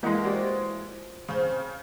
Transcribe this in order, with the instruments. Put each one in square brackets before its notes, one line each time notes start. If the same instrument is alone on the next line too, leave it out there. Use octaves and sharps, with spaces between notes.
[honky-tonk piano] E3 G#3 [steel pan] A#3 D#5 F#5
[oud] F3 [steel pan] F#4 G4 D5
[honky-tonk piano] C#3 [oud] C4 C5